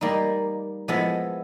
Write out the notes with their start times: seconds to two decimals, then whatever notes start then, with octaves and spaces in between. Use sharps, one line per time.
0.01 G3 A#3 D#4
0.88 F3 G#3 B3 E4 A4